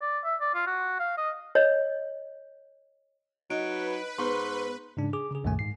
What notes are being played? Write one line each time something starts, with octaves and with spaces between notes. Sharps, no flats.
D5
E5
D5
F4
F#4
F5
D#5
C#5 D#5
F#3 D#4 B4 D7
G#2 B3 C6 C#6
G#2 C#3 D4
G#4 D6
C#3 G#4
C2 F#2 A#2 D#3 A3 G#5
G#2 C7